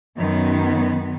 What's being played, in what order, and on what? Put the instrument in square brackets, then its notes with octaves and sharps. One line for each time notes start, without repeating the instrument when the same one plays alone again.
[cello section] F#2 D#3 B3